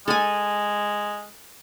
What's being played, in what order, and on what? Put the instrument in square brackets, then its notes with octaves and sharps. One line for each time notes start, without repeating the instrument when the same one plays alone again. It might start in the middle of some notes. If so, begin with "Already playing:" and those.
[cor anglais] G#3 [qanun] A4 G#5